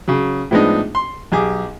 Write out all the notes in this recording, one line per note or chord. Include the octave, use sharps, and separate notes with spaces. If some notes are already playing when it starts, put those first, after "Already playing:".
C#3 F#3
A2 F3 G#3 B3 D4 D#4
C6
B1 G4 G#4 D6